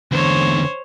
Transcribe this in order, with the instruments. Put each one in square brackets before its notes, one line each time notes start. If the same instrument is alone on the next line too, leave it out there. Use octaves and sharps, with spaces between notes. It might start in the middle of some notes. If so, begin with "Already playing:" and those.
[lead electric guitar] E2 D3 [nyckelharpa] C5 C#5